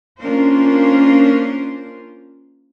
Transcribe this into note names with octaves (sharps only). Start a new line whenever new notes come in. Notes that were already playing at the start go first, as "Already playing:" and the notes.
A#3 C#4 D4 F4 A#4 C5